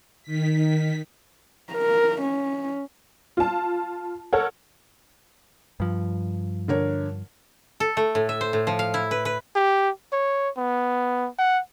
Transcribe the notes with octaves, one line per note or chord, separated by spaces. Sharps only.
D#3 B6
A#4
C#4
F4 A5
A4 A#4 C#5 F#5
G2 F3
D3 A#4 C#5
A4
A3
A2
E5
C5
A2
F3
F5
E4
B4
B4
G4
C#5
B3
F#5